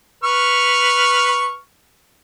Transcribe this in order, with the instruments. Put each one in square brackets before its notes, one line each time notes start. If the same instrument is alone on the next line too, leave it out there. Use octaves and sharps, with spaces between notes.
[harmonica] B4 C#6 F6